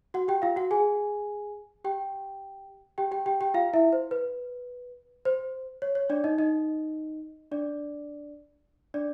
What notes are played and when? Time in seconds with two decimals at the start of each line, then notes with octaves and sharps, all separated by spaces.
0.14 F#4 F#5
0.28 G4 G5
0.42 F4 F5
0.56 F#4 F#5
0.71 G#4 G#5
1.84 G4 G5
2.98 G4 G5
3.11 G4 G5
3.26 G4 G5
3.41 G4 G5
3.54 F4 F5
3.73 E4 E5
3.93 C5
4.11 B4
5.25 C5
5.82 C#5
5.95 C#5
6.10 D4 D5
6.24 D#4 D#5
6.38 D#4 D#5
7.52 D4 D5
8.94 D4 D5